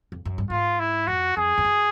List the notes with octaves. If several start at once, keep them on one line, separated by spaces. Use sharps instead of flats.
F2
F#2
G2
G#2 F4
E4
F2 F#4
F2 G#4
F2
F#2